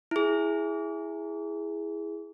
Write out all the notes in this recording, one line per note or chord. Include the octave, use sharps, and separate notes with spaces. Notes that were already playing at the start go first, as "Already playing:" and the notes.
E4 G#4